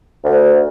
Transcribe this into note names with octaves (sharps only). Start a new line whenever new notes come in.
D2